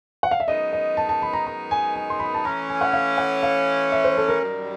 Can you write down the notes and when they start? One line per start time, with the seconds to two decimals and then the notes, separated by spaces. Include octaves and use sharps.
0.23 F#5
0.31 F5
0.40 E5
0.48 F#2 D#3 G#3 B3 D#4 D#5
0.73 D#5
0.97 A5
1.09 A5
1.22 B5
1.33 A#5
1.46 A#5
1.71 G#5
1.96 G#5
2.10 C6
2.20 B5
2.34 A5
2.45 E3 A3 C#4 A#5
2.69 G#5
2.81 F#5
2.93 F5
3.18 F#5
3.43 F5
3.92 E5
4.04 C5
4.17 A4
4.29 A#4
4.41 F#2 D#3 G3